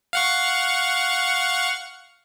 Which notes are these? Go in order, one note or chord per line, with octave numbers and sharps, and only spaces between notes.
F5 F#5 C#6